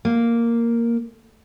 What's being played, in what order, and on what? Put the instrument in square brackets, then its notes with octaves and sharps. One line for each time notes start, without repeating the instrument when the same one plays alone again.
[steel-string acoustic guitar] A#3